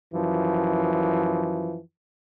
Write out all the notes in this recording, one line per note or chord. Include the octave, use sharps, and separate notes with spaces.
F#2 E3 F3